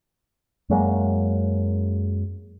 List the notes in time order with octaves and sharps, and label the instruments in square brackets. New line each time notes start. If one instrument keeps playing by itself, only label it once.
[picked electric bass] F#2 F#3 G#3 A#3